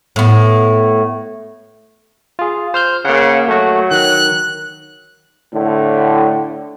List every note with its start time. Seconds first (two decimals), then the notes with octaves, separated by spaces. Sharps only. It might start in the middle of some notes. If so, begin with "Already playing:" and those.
0.16 A2 B3
2.39 F4 G#4
2.74 C5 F6 G6
3.05 C#3 A#3 F#5
3.48 F#3 A3 F#4
3.91 D#3 F#6
5.54 A2 D3